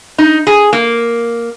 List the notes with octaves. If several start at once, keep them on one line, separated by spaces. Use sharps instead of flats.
D#4
G#4
A#3